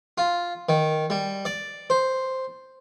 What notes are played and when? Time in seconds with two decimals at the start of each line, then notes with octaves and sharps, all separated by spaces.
0.18 F4
0.69 D#3
1.10 G3
1.45 D5
1.90 C5